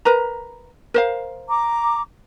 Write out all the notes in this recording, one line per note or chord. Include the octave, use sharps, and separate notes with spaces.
A#4 B4 A#5
A#4 C5 F5
A#5 D6